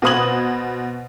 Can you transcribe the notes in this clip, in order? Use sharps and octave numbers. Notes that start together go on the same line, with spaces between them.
B2 B4 C5 D#6 G#6 F#7